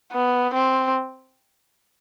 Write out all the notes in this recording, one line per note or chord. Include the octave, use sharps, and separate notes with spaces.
B3
C4